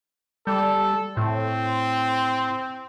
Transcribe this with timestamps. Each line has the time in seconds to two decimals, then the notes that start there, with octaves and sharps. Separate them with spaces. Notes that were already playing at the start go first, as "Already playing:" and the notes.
0.47 G3 A4
1.17 A2 C4